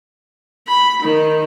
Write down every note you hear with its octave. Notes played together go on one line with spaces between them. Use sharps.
B5
D#3